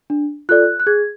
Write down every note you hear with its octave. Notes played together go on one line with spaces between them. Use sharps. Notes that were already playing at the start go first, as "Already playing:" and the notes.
D4
F4 A4 D5 F#6
F#6
G#4 G#6